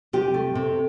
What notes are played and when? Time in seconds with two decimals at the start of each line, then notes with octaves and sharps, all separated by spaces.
0.13 C3 G4
0.34 A3
0.55 C3